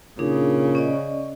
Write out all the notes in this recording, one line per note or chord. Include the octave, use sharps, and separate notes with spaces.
A#2 C#3 D4 D#4 G#4
C#4 D5 D#5